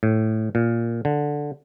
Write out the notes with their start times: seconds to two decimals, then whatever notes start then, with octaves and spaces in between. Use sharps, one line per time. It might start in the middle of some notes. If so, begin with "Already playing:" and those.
0.03 A2
0.55 A#2
1.05 D3